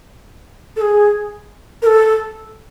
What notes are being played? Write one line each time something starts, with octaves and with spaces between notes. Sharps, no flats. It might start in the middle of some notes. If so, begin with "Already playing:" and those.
A4
G#4
A#4
A4